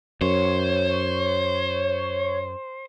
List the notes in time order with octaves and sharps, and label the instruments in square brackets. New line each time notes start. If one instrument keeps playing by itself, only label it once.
[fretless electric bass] F#2 [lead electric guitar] C5 [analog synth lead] C#5